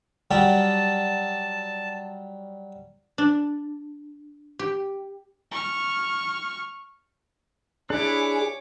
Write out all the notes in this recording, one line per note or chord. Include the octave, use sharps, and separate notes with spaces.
F#3 G3 G4 A5
D4
G4
C#6 F6
D4 E4 G#4 C#5 D6